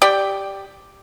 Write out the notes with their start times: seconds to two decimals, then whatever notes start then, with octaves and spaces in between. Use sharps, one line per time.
0.02 G4 D5 G5